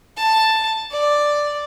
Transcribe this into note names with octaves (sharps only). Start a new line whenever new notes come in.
A5
D5